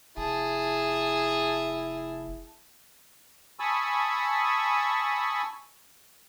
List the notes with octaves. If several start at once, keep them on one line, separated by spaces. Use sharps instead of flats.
F1 E4 G#4 A5
G#5 A5 B5 C#6 D#6 E6